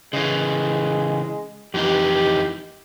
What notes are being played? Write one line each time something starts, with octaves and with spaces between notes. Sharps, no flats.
C#3 E3 G#3
F2 E3 D#4 G4